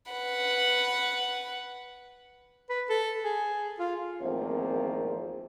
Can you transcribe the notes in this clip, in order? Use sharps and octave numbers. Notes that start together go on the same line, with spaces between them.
B4 F#5
B4
A4
G#4
F4
G#1 E2 F3 A3 A#3 C4